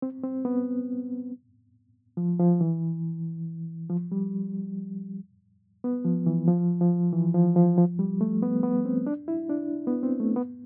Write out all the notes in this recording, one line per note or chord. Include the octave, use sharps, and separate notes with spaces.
C4
C4
B3
F3
F3
E3
F3
G3
B3
F3
E3
F3
F3
E3
F3
F3
F3
G3
A3
B3
B3
C4
D4
E4
D4
B3
C4
A3
B3